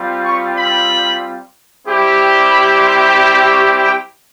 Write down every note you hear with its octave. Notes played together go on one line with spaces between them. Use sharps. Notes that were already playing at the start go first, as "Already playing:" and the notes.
Already playing: G3 C4 F4
C#6
B5
G3 C4 E4 G4
B5
C6
D6
C#6
G5